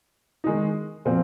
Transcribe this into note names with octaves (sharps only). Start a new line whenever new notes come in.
D#3 G#3 D#4
A#2 F3 C4